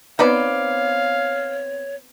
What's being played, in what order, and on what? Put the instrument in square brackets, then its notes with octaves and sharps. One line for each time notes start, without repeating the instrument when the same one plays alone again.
[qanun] B3 C4 [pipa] D#4 B4 D5 [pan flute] C#5 [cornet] F5